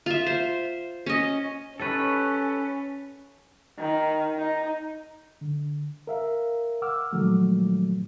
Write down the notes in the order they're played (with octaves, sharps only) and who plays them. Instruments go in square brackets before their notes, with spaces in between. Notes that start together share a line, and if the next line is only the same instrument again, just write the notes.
[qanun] F4 E5
C5
C#4 D#5
[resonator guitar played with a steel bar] G3 D#4 C#5 [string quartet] C#4 [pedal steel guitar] A4 B4
[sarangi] D#3
D#4
[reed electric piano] D3
A#4 E5 F5
F#5 D6 E6 F6
A#2 D#3 F3 F#3 G#3 A3